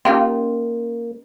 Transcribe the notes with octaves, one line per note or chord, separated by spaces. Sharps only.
A#3 C#4 D#4 F4 G4 C6